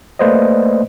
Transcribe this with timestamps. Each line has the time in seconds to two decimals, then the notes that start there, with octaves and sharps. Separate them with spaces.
0.19 A3 A#3 B4 C5 D5 D#5